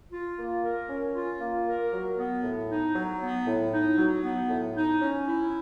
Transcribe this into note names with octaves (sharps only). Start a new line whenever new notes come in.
F4
A#3
A#4
C#4
F4
A#3
A#4
F#3
B3
A2
D#4
F#3
B3
A2
D#4
F#3
B3
A2
D#4
C#4
E4